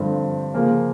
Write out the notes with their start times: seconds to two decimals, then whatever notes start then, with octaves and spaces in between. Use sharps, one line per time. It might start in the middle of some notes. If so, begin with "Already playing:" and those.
Already playing: G2 D3 F3 A3 C4
0.54 C#3 F3 A#3 C#4